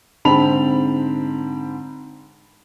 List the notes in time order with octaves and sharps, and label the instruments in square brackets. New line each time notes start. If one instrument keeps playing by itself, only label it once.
[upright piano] G#2 D3 C4 A5 B5 F7